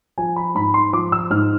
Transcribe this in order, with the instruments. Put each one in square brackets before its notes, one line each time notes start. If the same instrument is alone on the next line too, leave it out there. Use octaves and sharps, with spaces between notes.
[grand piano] F3 G#5
B5
G#2 B5
C6
F3 D6
E6
G#2 F6